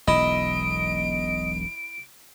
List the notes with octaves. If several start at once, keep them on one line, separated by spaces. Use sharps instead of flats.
E1 B1 E4 D#5 D7